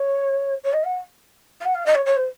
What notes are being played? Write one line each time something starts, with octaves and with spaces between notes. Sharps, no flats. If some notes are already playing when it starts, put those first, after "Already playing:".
Already playing: C#5
C#5
D#5
F#5
F5
F#5
F5
D#5
C#5
C#5
C5